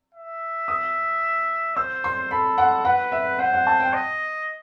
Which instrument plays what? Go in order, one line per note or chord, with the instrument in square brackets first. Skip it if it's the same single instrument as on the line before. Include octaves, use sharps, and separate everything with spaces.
[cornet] E5
[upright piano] D#6
[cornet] C5 [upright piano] E6
[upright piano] C6
[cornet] A4 [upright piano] B5
[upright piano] F#5
[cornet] B4 [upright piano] F#5
[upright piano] E5
[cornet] C5 [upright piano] F#5
[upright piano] F#5
A5
G5
[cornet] D#5